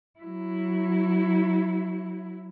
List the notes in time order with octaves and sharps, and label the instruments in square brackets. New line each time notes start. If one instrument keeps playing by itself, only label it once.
[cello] F#3 E4